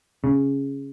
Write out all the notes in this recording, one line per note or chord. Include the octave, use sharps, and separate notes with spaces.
C#3